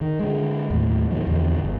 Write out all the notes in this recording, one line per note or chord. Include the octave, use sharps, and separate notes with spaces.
D#3
D3 G#3
D#2 A2
A#2 D#3 F3 F#3
E2 A#2 D3 F3
D1 G1